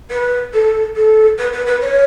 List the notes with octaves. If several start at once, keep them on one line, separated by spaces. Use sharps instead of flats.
B4
A4
A4
B4
B4
B4
C#5